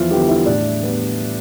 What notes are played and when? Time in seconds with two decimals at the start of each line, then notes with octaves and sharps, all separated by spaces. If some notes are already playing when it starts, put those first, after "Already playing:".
Already playing: E2 E3 F3 E4 F4
0.11 D3 F3 G3 B3 G4
0.29 E4 E5
0.46 A2 D4 D5
0.82 G3 B3